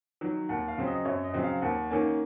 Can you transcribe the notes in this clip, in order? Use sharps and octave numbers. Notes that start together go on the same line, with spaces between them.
D#3 F#3
D#2 F#5
F5
C#3 F#3 C4
D#5
F#2 C#5
D#5
C#3 F#3 C4
F5
D#2 F#5
D#3 A#3 C#4